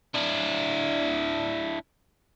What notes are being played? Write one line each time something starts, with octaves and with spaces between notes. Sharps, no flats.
D4 E4